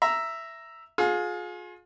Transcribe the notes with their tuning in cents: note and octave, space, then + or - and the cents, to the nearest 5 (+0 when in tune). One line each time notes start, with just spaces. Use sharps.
E5 +5 A#5 +0
F4 +35 G#4 +25